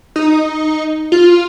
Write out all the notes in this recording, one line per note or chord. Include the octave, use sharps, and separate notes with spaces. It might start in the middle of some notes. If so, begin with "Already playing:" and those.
D#4
F4